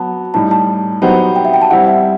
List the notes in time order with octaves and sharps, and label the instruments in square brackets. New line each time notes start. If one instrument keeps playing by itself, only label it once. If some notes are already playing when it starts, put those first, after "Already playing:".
Already playing: [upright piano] F#3 B3 F#4 [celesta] A5
[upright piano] A2 G3 D#4 [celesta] A5
[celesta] A5
[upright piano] F#3 B3 D#4 G4 C5
[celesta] G5
E5
G5
A5
[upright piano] G3 C4 E4 G4 [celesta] F#5
[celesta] E5